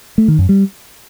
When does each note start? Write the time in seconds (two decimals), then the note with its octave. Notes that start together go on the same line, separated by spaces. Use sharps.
0.18 A3
0.28 D#3
0.39 F#2
0.49 G3